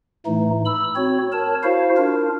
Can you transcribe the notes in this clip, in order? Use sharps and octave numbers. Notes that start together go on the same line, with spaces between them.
A2 E3 A3 D#4
B5 E6
C4 F#4 C#5
A#4 C#5 A5
E4 F#4 C5 F5
D4 F4 A#4